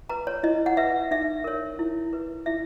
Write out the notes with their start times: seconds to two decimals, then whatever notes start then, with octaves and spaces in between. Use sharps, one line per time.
0.09 B4 A#5
0.27 C#5
0.43 E4 D#5
0.66 F#5
0.77 B4 E5
1.11 D#4 E5
1.44 A#4 C#5
1.79 E4
2.13 B4
2.46 E4 E5